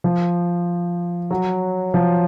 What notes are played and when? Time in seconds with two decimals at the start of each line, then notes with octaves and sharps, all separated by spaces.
0.04 F3
1.31 F#3
1.94 F3